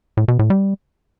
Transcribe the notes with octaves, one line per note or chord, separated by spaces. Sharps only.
A2
B2
A2
G3